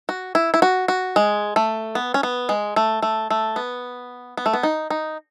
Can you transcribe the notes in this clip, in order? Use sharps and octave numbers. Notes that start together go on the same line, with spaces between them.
F#4
E4
E4
F#4
F#4
G#3
A3
B3
C#4
B3
G#3
A3
A3
A3
B3
B3
A3
B3
D#4
D#4